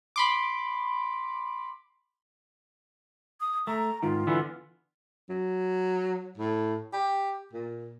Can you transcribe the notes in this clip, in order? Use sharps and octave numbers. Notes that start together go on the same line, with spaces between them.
B5 C6 D6
D#6
A3 A#5
G#2 D#3 F4
D3 E3 B3
F#3
A2
G4
A#2